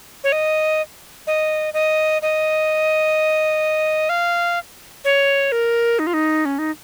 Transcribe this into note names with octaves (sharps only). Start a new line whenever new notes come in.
C#5
D#5
D#5
D#5
D#5
F5
C#5
A#4
D#4
F4
D#4
C#4
D#4